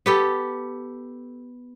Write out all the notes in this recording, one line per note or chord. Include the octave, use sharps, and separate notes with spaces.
B3 G4 A4